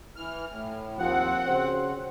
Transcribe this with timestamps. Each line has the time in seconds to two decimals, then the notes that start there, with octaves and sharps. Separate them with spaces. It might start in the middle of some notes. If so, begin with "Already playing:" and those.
0.16 E3 F6
0.50 A2
0.99 D#2 F3 C4 F#5
1.47 C#3 F#4 C5